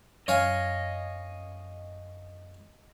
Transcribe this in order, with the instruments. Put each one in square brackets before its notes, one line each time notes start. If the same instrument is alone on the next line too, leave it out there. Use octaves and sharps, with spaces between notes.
[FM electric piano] F#2 [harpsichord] C#5 F5 G#5 [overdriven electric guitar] D#5